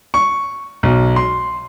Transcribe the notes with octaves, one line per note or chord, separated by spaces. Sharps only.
C#6
B1
C6